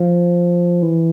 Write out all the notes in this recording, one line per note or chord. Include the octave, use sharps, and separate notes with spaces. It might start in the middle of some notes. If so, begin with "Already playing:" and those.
Already playing: F3
E3